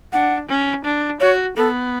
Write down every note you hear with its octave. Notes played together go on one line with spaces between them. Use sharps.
D4 F#5
C#4
D4
F#4 C#5
B3 A4